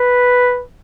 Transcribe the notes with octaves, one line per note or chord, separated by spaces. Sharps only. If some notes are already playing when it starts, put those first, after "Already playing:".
Already playing: B4